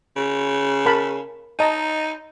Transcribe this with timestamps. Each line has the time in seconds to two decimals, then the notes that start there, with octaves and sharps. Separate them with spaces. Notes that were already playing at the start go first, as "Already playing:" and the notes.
0.17 C#3
0.86 A#4 A5 B5
1.59 D#4 D#5 A5 A#5